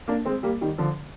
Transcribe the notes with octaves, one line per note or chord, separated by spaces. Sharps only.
A#3 D4
G#3 C4
G3 A#3
D#3 G3
D3 F3